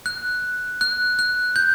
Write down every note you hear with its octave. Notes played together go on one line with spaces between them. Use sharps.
F#6
F#6
F#6
G6